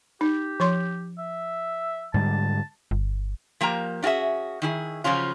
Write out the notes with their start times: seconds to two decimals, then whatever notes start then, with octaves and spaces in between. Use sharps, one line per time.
0.21 D#4 G4
0.60 F3 C#5 C6
1.18 E5
2.14 G#2 D3 G3 A5
2.91 G1
3.61 F3 A#3 G4 A#5
4.03 C#4 F4 F#4 G#4 E5
4.62 D#3 E4 G#4
5.04 C#3 F3 F#3 C#4 F4